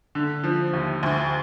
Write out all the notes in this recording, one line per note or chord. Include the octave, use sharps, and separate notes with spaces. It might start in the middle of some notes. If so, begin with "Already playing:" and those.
D3
F3
D#2
D2